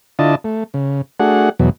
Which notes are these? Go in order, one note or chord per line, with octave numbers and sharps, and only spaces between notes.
D3 D4 E4 F4 D#5 A5
A3
C#3
A3 D4 F#4 G#4 F#5
E2 B2 F#3